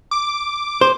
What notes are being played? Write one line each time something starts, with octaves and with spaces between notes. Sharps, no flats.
D6
C5